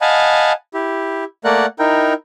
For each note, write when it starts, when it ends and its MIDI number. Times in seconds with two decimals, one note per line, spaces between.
0.01 0.52 75
0.01 0.52 77
0.01 0.52 78
0.01 0.52 80
0.01 0.52 81
0.01 0.52 83
0.74 1.24 64
0.74 1.24 67
1.45 1.66 57
1.45 1.66 58
1.45 1.66 70
1.45 1.66 74
1.45 1.66 78
1.45 1.66 90
1.79 2.13 63
1.79 2.13 64
1.79 2.13 70
1.79 2.13 79